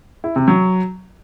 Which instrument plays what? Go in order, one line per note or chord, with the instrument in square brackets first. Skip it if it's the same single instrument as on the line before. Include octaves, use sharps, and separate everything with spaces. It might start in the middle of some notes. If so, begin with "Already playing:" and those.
[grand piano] E4
C3
F#3